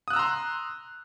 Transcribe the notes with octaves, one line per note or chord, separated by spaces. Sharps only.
A#5 C6 D#6 E6 F#6